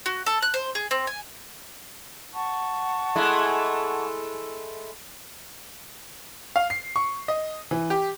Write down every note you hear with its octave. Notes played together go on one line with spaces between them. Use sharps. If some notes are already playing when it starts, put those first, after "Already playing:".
F#4
A4
F#6
C5
G#4
C4
G#5
F#5 A5 C#6
G#3 A3 E4
F5
C7
C#6
D#5
E3
G4